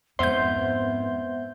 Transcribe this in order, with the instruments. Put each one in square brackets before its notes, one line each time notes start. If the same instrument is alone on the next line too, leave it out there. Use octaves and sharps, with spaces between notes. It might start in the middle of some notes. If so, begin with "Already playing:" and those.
[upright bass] F2 G#2 [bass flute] B3 [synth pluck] C5 G6 [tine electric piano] E5 F#5 C6